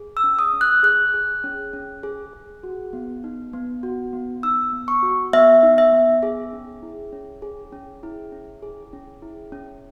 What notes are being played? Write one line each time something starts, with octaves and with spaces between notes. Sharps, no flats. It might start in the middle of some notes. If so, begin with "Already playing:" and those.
Already playing: G#4
E6
C#4
D#6
C#4
F#6
G#4 F#6
G#4
C#4
C#4
G#4
G#4
F#4
B3
D#4
B3
F#4
B3
D#4 E6
B3
C#6
F#4
B3 E5
D#4
E5
B3
G#4
C#4
E4
C#4
G#4
C#4
E4
C#4
G#4
C#4
E4
C#4